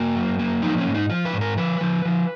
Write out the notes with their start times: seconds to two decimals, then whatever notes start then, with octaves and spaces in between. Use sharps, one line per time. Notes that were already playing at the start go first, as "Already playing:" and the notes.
Already playing: A#3 F#4
0.16 F#2
0.39 A#3
0.62 F3 D#4
0.78 C#4
0.86 G#2
0.94 D#4
1.09 F3 F4
1.25 B4
1.33 G#2
1.41 A#4
1.57 F3 B4
1.81 F3
2.05 F3